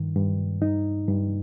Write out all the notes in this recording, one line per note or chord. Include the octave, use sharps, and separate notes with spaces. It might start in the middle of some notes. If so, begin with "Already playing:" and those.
Already playing: G2 D#3
G2
G2 D#4
G2